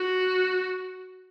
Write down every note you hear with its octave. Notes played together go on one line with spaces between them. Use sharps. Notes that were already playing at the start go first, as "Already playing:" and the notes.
Already playing: F#4